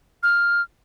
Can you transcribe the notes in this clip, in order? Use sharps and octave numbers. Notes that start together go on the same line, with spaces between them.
F6